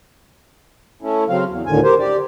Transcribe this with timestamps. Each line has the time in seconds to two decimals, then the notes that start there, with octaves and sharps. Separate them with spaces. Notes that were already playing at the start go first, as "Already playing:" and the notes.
1.02 A3 C#4 E4
1.29 C#3 F#3 C4 F5
1.48 E2
1.66 D2 A2 D3 D#3 G#5
1.83 G4 A#4 C5
1.99 G4 D5